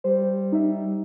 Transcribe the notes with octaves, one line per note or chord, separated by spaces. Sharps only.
G3 C5
D#4 E5